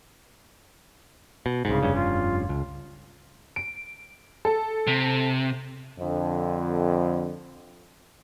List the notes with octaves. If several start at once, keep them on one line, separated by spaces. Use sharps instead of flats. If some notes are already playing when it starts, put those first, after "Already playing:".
B2
C2 G#2 C#3
F1 G2 C#4
F4
C#2
D7
A4
C3
F2 D3